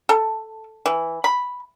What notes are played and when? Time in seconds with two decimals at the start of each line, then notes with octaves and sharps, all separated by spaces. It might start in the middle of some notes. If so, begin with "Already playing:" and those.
0.09 A4
0.86 E3
1.24 B5